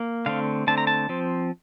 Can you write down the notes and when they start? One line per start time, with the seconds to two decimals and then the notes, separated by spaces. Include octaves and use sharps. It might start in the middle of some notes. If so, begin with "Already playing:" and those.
Already playing: A#3
0.26 D3 A3 C4 F5
0.67 D3 A3 C4 A5
0.78 A#5
0.87 A5
1.09 F3 C4